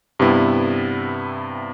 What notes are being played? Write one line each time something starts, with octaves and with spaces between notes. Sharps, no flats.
G2 C3 B3 E4